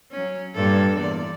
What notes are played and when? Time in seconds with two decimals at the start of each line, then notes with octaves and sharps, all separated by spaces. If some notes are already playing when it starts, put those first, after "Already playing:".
0.11 F#3 C#4
0.55 G2 A#2 A4
0.98 E2 A#2 D5